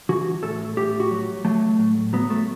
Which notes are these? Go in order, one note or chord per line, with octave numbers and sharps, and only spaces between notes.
E3 F#4
A2 A4
A2 G4
F#4
F#3
F#3 A3
A2
F#3 B3
A3